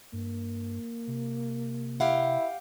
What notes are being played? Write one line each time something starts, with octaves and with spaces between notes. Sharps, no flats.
G2 A#3
C3
E4 G4 F5 F#5